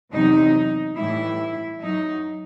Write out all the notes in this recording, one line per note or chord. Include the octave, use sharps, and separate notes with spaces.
E2 C3 F#3 D#4
A2 E3 G3 E4
F#2 F#3 D#4